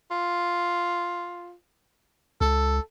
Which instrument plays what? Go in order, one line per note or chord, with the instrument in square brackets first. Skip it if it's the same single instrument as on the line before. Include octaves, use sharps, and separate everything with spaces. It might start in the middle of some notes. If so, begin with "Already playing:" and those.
[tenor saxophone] F4
[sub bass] C#2 [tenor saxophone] A4